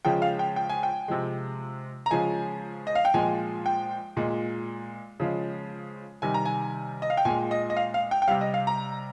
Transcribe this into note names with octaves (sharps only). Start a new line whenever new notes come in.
C#3 F3 G#3 G5
F5
G5
G5
G#5
G5
C3 F3 G#3
A#5
C#3 F3 G#3 G#5
D#5
F5
G5
A#2 F3 G#3 G#5
G5
A#2 G#3
C#3 F3 G#3
C3 D#3 G3 G#5
A#5
G#5
D#5
F5
G5
A#2 G#3 G#5
D#5
D#5
F5
F5
G5
G5
C3 G3 F5
D#5
F5
A#5